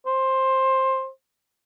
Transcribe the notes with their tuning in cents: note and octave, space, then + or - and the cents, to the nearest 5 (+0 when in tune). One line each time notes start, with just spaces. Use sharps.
C5 +15